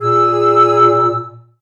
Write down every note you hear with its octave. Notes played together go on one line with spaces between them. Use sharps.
A#2 G#4 E6